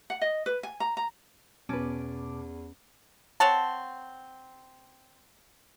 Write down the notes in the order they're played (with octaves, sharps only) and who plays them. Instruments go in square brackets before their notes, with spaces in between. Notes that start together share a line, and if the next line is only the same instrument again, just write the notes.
[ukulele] F#5
D#5
B4
G#5
A#5
A#5
[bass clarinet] E2 [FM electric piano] B2 A5 D6 [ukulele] C#4 B4
[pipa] C4 C#5 F#5 A5